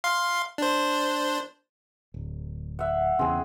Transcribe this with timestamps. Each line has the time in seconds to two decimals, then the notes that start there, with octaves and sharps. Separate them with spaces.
0.04 F5 C6
0.58 D4 C5
2.14 D1
2.79 E5 F#5
3.19 E2 C#3 C4 G#4